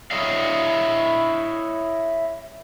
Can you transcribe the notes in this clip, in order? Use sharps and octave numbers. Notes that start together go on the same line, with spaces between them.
E4 C#5 D#5 F5